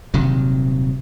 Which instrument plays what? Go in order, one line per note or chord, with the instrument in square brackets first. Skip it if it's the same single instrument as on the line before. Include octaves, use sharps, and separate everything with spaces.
[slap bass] D#1 C3 D#3 F#3